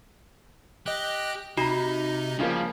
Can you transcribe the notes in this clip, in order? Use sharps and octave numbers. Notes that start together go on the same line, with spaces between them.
G4 D#5 F#6
C3 D#4 F#4 D#5 A#5 B5
C#3 F3 G3 A#3